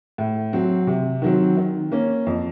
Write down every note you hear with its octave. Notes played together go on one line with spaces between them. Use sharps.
A2
F#3 C4
C3
D#3 F#3 C4
D#3
A#3 C#4
F2